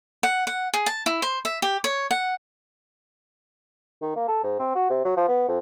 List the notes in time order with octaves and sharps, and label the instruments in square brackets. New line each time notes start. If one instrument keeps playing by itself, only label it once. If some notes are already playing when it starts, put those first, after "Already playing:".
[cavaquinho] F#5
F#5
G#4
A5
E4
C5
E5
G4
C#5
F#5
[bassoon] D#3
A#3
A4
G#2
C4
F#4
C3
F#3
F3
B3
F2